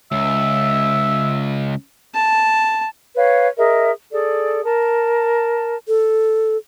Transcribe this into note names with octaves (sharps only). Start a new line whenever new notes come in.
C#2 E5
A5
B4 C#5 F5
G#4 A#4 D#5 E5
G#4 A4 D5
A#4 A5
A4